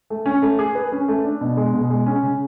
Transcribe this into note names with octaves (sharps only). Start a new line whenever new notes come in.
A3
C#4
A3
G#4
B4
C#4
A3
D4
B2
G#3
B2
G#3
C#4
C#3